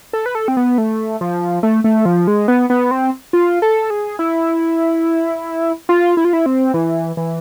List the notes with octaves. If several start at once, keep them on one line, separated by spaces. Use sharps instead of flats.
A4
B4
A4
C4
B3
A3
F3
A3
A3
F3
G#3
B3
B3
C4
F4
A4
G#4
E4
F4
E4
F4
E4
C4
E3
E3